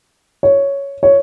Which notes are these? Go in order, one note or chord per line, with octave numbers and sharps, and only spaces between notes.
C#5
C#5